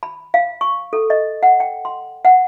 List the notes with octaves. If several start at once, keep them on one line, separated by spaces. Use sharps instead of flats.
B5
F5
C#6
A4
D#5
F#5
G5
C6
F#5